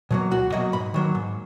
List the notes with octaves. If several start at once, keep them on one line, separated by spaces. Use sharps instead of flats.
B2 F#3 A#3
C#2 F#4
B2 F#3 A#3 D#5
G#2 B5
D#3 F#3 A#3
G#2